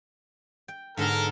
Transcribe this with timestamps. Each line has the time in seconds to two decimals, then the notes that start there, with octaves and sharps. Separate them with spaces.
0.68 G5
0.97 G#2 D3 B3 A4 A#4